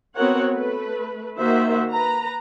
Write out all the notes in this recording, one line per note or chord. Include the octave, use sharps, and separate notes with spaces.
B3 C4 F#4 A#4 C#5 F#5
A3 B4
D#3 A#3 F#4 C5 E5
B4 A#5